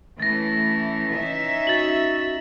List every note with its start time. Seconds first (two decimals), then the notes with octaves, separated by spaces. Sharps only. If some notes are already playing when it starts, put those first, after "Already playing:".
0.20 E3 A3 C#4 A6 A#6
1.14 E3 C#4 D#4 E5
1.67 F#4 A6 F#7